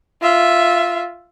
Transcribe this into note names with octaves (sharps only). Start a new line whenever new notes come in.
F4 E5